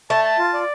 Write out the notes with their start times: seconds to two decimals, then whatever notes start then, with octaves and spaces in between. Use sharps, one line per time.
0.10 A3 A5
0.24 A5
0.39 F4
0.54 D5